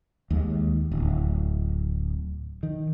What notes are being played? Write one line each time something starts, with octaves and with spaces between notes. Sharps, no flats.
D#2 G#3
D1
D#3